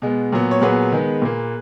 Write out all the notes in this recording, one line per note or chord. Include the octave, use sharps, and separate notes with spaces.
B2 G#3 B3
A#2 F#3 B3
C#5
A#2 F#3 B3 G#4 B4
D#3 G#3 B3
A#2 A#3